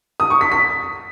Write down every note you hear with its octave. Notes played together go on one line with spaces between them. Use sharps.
D#6
C#6
B6
B6